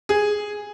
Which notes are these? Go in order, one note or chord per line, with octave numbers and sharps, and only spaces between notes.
G#4